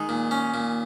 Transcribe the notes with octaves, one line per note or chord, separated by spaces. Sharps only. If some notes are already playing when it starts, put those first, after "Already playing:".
Already playing: D#3 G#3 D#4
A#2
C#4
A#2